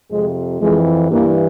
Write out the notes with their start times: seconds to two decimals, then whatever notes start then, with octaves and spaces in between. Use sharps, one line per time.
0.11 F2 C3 F3 G#3
0.61 F2 E3 G#3
1.10 G2 E3 A#3